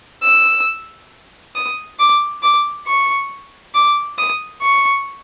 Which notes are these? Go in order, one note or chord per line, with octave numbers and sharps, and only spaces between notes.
E6
D#6
D6
D6
C#6
D6
D#6
C#6